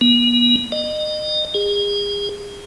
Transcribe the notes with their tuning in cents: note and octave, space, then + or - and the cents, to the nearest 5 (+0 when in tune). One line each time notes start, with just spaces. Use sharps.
B3 -45
D#5 -30
G#4 -35